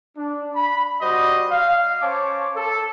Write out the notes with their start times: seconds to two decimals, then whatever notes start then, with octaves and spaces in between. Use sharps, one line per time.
0.17 D4
0.55 B5
1.01 G3 F#4 C5 D5 D#5
1.51 F5
2.02 C#4 C5 C#5 A5 D6
2.57 A4